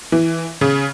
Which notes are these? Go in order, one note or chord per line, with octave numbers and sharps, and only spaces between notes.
E3
C#3